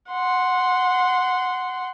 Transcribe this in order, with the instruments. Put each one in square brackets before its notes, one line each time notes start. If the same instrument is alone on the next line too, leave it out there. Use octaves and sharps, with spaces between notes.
[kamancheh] F#5 C6